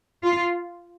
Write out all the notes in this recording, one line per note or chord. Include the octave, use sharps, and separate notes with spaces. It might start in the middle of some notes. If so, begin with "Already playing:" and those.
F4